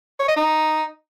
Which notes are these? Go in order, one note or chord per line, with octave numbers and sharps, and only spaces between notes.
C#5
D#5
D#4